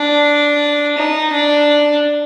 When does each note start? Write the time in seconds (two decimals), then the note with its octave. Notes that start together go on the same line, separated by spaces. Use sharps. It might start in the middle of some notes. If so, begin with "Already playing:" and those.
Already playing: D4
0.97 D#4
1.32 D4